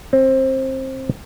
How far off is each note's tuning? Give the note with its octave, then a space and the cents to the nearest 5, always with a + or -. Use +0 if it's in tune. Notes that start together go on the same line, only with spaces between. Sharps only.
C4 +20